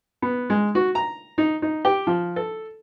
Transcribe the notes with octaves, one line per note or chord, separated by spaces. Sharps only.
B3
G#3
F#4
A#5
D#4
D#4
G4
F3
A4